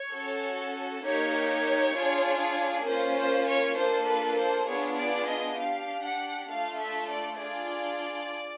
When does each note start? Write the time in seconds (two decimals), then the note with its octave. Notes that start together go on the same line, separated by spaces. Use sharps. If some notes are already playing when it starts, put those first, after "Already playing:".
Already playing: C#5
0.13 C#4 F#4 A4
1.04 A#3 D#4 G4 C#5
1.96 D4 F4 G#4
2.86 A#3 C#4 F4 C5
3.17 C5
3.47 C#5
3.77 A#3 D4 F4 A4 C5
4.07 B4
4.38 C5
4.68 B3 D4 F4 G#4 C#5
4.99 D5
5.29 D#5
5.59 D4 G4 F5
6.05 F#5
6.50 A3 D4 F4 A4 F5
6.80 E5
7.11 D5
7.41 D4 F4 G#4 D5